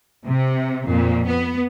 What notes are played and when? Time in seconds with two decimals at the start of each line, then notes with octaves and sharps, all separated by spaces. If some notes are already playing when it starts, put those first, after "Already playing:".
0.25 C3
0.86 F2 A#2
1.27 B3